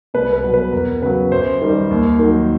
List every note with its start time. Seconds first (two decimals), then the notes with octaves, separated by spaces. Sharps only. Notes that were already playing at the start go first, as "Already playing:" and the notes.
0.14 C2 B4
0.33 B4
0.43 B2 F#3
0.54 B4
0.72 E2 A#4
1.02 C#3 F#3 B4
1.31 F#2 C5
1.61 D#3 G3
1.91 D#2
2.19 D#3 F#3